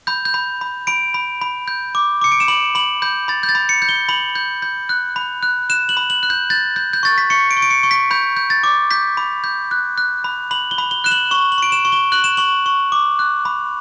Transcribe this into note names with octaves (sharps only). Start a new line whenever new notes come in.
B5 G6
G6
B5
B5
B5 D7
B5
B5
G6
D6
D6 C#7
D7
E7
B5 F#7
B5 F#7
B5 G6
B5 A6
G6
A6
B5
C#7
G6
G7
B5 F#7
G6
G6
F#6
B5
F#6
F#6 E7
F#7
B5
F#7
F#6
G6
G6 A6
G6
G6
C#6 A6
B6
C#6 C#7
D7
C#6
D7
C#7
C#6
B6
B5 G6
G6
A6
D6
G6 B6
B5
G6
F#6
F#6
B5
B5 F#7
G7
B5
G7
F#6 E7
F#7
C#6 G7
F#7
C#6 D7
E7
C#6
G7
F#6 F#7
E7
C#6 F#7
C#6
D6
F#6
B5